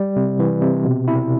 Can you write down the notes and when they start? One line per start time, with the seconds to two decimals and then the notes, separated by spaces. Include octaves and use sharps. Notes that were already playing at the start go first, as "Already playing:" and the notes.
Already playing: G3
0.16 C3
0.39 E3
0.62 C3
0.85 B2
1.08 E4